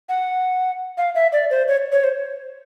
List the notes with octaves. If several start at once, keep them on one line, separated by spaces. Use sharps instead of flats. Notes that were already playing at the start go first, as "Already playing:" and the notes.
F#5
F5
E5
D5
C5
C#5
C#5
C5